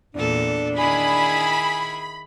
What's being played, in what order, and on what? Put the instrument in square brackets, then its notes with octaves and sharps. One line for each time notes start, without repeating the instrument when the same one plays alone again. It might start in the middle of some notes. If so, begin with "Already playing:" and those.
[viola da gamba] E2 A#2 A4 [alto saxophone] D4
[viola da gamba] D#3 E4 G#4 [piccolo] G#5 [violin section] B5